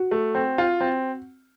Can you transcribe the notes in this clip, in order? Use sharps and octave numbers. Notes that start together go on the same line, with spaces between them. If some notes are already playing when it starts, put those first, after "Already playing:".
Already playing: F#4
A3
C4
F4
C4